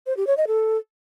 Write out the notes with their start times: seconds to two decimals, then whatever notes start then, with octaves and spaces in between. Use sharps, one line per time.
0.07 C5
0.17 G4
0.27 C#5
0.37 D#5
0.47 A4